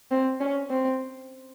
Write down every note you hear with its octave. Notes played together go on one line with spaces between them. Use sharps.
C4
C#4
C4